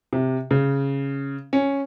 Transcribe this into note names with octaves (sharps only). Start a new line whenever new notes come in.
C3
C#3
C#4